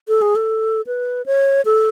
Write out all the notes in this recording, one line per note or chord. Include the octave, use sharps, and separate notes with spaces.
A4
G#4
A4
B4
C#5
A4